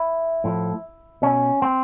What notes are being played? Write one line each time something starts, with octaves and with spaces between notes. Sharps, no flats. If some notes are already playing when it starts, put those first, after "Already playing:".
Already playing: E4
A2 F3
B2 C#4
C4